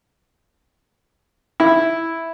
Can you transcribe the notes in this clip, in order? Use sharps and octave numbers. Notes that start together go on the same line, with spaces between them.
E4